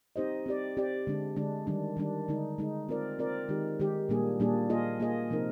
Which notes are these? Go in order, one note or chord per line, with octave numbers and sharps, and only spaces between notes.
C4 D#4 G4 C5 D#5
C4 G4 D5
C4 G4 D5
D3 G#3 D4
D3 G#3 D4
D#3 G3 D4
D#3 G3 D4
D3 G#3 D#4
D3 G#3 D#4
C4 F4 A#4 D5
C4 F4 A#4 D5
D#3 G#3 D#4 G4
D#3 G#3 D#4 G4
A#2 G3 A#3 D4 G#4
A#2 G3 A#3 D4 G#4
A#3 F4 G#4 D#5
A#3 F4 G#4 D#5
C3 F3 C4 D#4 A#4